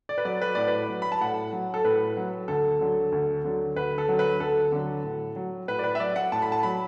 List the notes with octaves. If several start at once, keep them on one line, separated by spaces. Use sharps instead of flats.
D5
B4
F#3 D5
B4
A2 D5
B4
F#3
B5
A5
A2 F#5
F#3
A4
A2 B4
F#3
D2 A4
D3 F#3
D2
D3 F#3
D2 B4
A4
D3 F#3
B4
D2 A4
D3 F#3
A2
F#3
A2 B4
D5
B4
E5
F#3 D5
F#5
A2 A5
B5
A5
F#3 B5